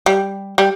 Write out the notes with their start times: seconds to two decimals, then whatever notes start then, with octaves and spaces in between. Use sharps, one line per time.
0.06 G3
0.58 G3